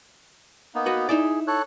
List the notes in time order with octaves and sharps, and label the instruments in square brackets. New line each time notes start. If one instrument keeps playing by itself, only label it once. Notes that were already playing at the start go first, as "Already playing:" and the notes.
[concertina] A#3 B3 D#4
[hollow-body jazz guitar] F#4 B4
[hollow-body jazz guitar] D#4 E4 D5 [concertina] G#4
[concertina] A4 C#5 F#6